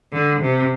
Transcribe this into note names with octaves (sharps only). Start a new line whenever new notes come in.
D3
C3